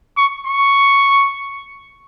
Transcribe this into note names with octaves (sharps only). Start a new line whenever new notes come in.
C#6
C#6